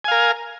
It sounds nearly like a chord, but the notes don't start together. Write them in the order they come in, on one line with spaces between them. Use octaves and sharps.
G#5 F5 A#4